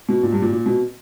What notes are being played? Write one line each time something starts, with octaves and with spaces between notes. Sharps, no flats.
B2
A#2
G2
A#2
A#2
B2